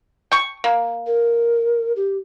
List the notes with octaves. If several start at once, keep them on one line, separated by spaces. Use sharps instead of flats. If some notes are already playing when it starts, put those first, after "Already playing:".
G5 C#6
A#3
A#4
G4